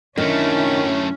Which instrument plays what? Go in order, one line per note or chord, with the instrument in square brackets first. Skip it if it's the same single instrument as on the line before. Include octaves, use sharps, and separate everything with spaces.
[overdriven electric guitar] F#2 A3 [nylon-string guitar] D#3 [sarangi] C#4 [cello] D4 E4